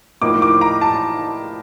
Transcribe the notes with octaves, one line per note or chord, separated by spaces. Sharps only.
A2 F3 A#3 D#4 D6
D6
A#5
A5